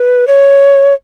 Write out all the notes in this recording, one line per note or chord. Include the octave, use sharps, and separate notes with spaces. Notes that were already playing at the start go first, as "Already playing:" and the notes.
Already playing: B4
C#5